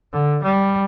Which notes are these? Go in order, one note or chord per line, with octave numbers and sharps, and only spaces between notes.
D3
G3